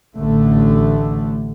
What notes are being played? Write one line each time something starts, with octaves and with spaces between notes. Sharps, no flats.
A1 D3 A3